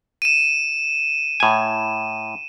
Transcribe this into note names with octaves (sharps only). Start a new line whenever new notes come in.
D#7 E7
A2 G#5